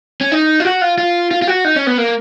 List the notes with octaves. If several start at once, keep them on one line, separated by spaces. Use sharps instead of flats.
C#4
D#4
F4
F#4
F4
F4
F4
F4
F#4
D#4
C#4
B3
A#3